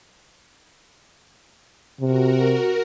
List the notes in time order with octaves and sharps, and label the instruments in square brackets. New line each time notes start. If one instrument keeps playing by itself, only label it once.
[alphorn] C3 [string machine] F#4 A#4